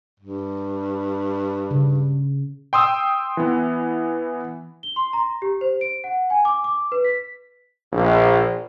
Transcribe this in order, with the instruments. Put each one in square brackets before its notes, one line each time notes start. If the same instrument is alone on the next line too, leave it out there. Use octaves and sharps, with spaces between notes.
[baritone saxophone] G2
[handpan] C#3
[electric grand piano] G5 C6 D#6 E6
E3 B3
[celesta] G7
C6
A#5
G4
C5
D7
F#5
G#5
D6
D6
B4
B6
[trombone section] A#1